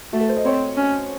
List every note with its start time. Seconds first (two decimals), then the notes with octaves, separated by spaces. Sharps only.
0.13 A3 F#4
0.21 A4
0.29 C5
0.37 D#5
0.45 C4 C#5
0.77 C#4